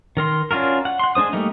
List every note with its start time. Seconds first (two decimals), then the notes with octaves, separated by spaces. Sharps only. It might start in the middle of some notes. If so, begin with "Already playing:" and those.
0.17 D#3 A#4 C6
0.51 C#4 D4 F4 F#4 A#4
0.85 F#5
0.99 F#5 C6
1.15 G#3 D4 C5 D#6
1.33 G3 A3 A#3 D#4